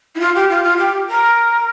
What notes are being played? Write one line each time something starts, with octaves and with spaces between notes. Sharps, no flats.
E4
F4
G4
F4
F4
G4
A#4